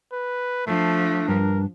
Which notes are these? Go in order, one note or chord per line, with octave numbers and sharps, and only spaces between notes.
B4
F3 A3 D4
G2 A#4